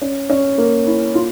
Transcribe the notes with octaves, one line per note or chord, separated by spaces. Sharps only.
C#4
C#4
A#3
E4
F4